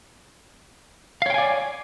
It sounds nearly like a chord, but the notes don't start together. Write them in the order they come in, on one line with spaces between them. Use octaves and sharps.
F5 C#5 G5 G#5 D5